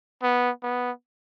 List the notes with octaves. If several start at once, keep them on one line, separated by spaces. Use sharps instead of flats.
B3
B3